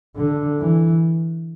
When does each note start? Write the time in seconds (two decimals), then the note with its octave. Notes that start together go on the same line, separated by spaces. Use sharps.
0.16 D3
0.60 E3